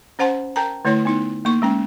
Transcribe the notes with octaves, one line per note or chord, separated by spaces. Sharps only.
C#4 C5 F#5 A5 C6
A#4 G5 A5 A#5
D3 A3 E4 C#5 C6
B3 D#4 C6
A#3 D#4 C#6
G#3 C#4 G5